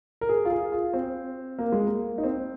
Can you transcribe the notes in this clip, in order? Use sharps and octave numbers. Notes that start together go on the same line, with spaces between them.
A#4
G#4
F4
G#4
F4
C4
A#3
G#3
A#3
D#4
C4